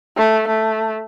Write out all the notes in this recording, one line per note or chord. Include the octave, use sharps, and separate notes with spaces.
A3
A3